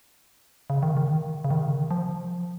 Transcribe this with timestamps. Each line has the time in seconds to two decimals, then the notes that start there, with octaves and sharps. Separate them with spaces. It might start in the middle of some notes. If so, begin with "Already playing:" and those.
0.70 C#3
0.83 D#3
0.97 D#3
1.44 C#3
1.51 D#3
1.91 F3